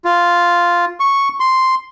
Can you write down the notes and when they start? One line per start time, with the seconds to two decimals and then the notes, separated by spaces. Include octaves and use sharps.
0.05 F4
1.00 C#6
1.40 C6